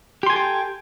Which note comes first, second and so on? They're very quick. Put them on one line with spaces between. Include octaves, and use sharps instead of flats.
G4 C6 G#5 A4 G5